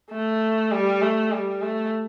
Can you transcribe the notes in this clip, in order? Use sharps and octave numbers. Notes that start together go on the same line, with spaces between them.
A3
G3
A3
G3
A3